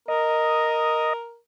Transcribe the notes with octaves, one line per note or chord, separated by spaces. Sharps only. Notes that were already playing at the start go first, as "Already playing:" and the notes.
A#4 D#5